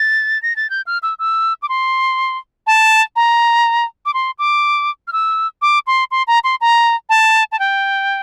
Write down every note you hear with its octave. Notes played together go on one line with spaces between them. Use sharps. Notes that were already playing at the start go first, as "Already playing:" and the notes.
Already playing: A6
A#6
A6
G6
F6
E6
E6
D6
C6
A5
A#5
D6
C6
D6
F6
E6
D6
C6
C6
A#5
C6
A#5
A5
A5
G5